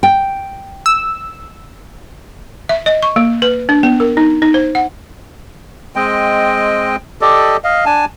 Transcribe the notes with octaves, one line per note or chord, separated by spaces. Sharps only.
G5
E6
E5
D#5
C#6
A#3
B4
D4
B3
A#4
D#4
D#4
C5
F#5
G#3 C4 D#5 G5
G4 A4 D5 D#5
D#5 F5
D4 G#5 A5